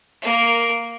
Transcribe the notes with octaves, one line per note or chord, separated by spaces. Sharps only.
A#3 A#4